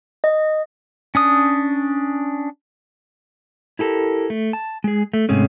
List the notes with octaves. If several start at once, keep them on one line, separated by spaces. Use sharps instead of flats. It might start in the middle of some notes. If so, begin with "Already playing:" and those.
D#5
C#4 D4 D#6
E4 G4 A4 A#4
A3
A5
G#3 G#4
A3
G#2 C3 G#3 A3 C#4